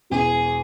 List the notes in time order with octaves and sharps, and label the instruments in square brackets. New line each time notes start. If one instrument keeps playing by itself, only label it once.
[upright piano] E1 E2 B2 [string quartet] G#4